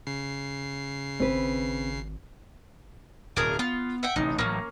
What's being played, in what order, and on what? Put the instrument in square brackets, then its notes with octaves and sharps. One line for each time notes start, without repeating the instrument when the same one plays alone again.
[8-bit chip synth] C#3 C7
[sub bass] G#1 [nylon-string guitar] C4 B4
[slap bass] D1 B2 [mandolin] D4 G#4 A#4
[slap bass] B3 [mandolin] F4
[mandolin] E5 F#5 G5
[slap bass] A1 C3 [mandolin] D#4
[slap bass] A1 A2 F#3 [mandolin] A#3 C#4